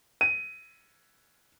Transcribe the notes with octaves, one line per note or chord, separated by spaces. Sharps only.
D#7